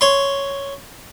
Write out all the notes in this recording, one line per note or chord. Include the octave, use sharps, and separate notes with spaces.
C#5 C6